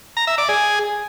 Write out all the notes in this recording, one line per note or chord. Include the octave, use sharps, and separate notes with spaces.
A#5
E5
D5
G#4